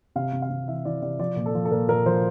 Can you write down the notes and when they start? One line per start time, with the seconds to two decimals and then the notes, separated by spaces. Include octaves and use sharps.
0.16 C3 F5
0.33 C3
0.42 F5
0.50 C3
0.68 E3 E5
0.85 E3 D5
1.02 C3 D5
1.19 F3 D5
1.36 A#2
1.46 A4
1.55 F3
1.65 A4
1.71 A#2 A#4
1.89 A#2 A#4
2.06 F3 C5